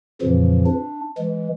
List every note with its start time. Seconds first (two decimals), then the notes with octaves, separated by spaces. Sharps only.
0.22 F2 A#2 C#3 E3 F3
0.67 D4
1.18 E3 G#3